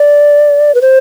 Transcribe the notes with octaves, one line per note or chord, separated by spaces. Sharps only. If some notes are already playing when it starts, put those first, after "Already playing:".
Already playing: D5
B4
C5